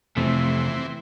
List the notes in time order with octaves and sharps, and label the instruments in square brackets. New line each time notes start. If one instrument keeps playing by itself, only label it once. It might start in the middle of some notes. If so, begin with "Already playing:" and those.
[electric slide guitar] F2 C3 A3 [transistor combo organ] E3 C4